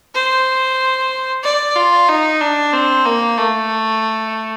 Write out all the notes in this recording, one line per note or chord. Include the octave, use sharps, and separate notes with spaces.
C5
D5
F4
D#4
D4
C4
A#3
A3